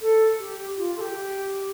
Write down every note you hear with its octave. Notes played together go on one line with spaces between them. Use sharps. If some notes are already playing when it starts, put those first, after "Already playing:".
A4
G4
F4
A4
G4